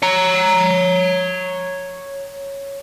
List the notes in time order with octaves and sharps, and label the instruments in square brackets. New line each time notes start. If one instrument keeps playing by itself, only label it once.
[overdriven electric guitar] C#5 A#5